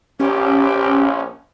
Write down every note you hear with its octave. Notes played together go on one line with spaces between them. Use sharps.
A#1 C#4 G4